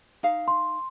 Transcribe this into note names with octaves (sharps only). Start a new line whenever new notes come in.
D#4 F5
C6